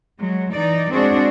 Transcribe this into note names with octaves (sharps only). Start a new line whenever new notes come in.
F#3 G#3
E3 D#4 D5
G#3 C4 D4 F#4 G#4 D5